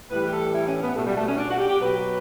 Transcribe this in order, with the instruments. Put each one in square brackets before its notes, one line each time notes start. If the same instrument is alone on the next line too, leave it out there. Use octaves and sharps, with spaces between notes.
[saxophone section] A2 E3 G3 B4
G4
A4
E4
C#4
B3
B2 G3 A3
G3
A3
C#4
D4
F#4
G4
G4
B2 F#3 B4